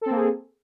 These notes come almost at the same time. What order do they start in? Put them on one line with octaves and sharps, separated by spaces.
A4 C4 A#3 G#4